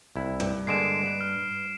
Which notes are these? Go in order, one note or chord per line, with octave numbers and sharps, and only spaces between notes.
C2 E4
G2
D3 G#3 A#3 C7 D7 E7
B4
F6